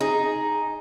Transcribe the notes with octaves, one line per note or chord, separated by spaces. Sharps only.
D#4 G#4